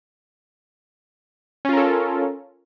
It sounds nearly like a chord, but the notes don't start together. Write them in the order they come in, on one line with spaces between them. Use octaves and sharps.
C#4 F4 A#4 A4